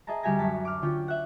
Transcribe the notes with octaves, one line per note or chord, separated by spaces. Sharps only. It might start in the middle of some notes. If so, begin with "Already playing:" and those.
G#4 D#5 E5 A5 A#5
D2 G3 G4 E5 G#5 A#6
F#2 A5 B6
D6 F6
D3 C#4 F4 G5
E5 F#5